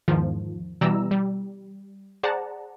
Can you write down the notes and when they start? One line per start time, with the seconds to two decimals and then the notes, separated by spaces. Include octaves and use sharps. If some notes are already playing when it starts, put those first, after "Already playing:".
0.08 E2 G#2 D#3 F3
0.81 B2 E3 G3 D5 A#5 E6
1.11 G3
2.23 G#4 C5 D5 F#5 A5 A#5